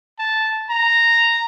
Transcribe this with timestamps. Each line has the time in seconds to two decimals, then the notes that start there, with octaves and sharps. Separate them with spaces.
0.19 A5
0.70 A#5